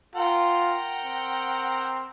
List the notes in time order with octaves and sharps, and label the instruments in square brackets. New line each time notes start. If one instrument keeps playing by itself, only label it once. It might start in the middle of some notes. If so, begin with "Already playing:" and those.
[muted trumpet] F4 [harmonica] A#4 F#5 G5
[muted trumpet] C4